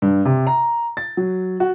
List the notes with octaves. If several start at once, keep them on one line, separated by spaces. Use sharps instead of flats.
G2
C3
A#5
A6
F#3
F#4